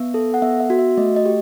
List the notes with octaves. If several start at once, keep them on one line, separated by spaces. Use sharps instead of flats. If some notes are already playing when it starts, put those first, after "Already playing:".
Already playing: B3 E5
A4
F#5
B3 E5
E5
F#4
E5
A3 D#5
D#5
G4